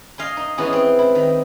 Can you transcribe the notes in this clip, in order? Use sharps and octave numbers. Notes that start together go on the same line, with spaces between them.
D#5 F5 G#5 C6
D#4
E3 G#3 B3 C#4 E4 G#4
C4 C6
E4
D#3